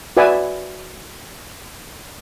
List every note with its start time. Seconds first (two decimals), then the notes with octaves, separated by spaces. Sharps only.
0.17 F#4 B4 D5 E5 G#5